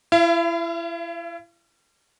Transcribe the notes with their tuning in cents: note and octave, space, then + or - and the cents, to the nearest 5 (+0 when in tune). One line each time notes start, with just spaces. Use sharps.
E4 +30 F5 -40